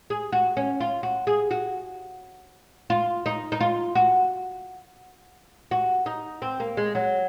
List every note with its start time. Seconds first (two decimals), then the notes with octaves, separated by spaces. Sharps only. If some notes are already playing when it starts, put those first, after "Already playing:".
0.10 G#4
0.32 F#4
0.57 C#4
0.80 F4
1.03 F#4
1.27 G#4
1.51 F#4
2.90 F4
3.26 D#4
3.52 D#4
3.61 F4
3.95 F#4
5.71 F#4
6.06 D#4
6.42 C4
6.60 A#3
6.77 G#3
6.95 F#3